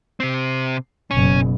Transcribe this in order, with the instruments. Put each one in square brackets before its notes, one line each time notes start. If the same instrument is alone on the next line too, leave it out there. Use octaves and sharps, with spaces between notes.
[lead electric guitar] C3 C4
[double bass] F#1 B2 [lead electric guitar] C#4